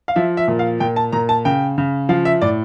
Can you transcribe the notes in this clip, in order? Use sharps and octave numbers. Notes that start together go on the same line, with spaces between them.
F5
F3 E5
E5
A#2
F5
A#2 G5
A5
A#2 A#5
A5
C#3 G5
C#3
F3 F5
E5
A2 D5